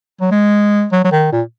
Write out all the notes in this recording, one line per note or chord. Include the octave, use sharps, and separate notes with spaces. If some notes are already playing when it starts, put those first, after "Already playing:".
F#3
G#3
F#3
F#3
D#3
A#2